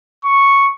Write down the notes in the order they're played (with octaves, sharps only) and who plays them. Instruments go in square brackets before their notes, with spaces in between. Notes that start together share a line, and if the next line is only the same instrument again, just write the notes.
[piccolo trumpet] C#6